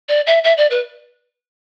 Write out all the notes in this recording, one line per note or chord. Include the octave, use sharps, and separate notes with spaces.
D5
E5
E5
D5
B4